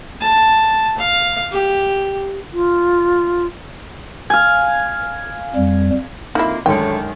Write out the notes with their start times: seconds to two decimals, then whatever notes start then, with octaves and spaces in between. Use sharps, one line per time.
0.21 A5
0.98 F5
1.51 G4
2.53 F4
4.30 F5 G#5
5.55 F2 G3
6.35 F2 A#3 D#4 E4
6.66 F#2 D3 D#3 G#3 A3 C#4 G5